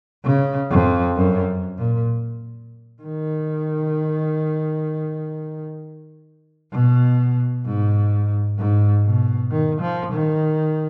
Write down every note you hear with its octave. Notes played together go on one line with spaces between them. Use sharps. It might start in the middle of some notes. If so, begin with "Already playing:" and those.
C#3
F2
F#2
A#2
D#3
B2
G#2
G#2
B2
D#3
F3
D#3